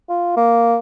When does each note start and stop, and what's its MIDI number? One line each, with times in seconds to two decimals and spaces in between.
0.10 0.36 65
0.37 0.77 58